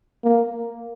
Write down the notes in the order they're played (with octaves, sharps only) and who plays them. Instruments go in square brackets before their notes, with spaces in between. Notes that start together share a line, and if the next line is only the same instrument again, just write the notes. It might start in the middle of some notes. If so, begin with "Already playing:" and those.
[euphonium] A#3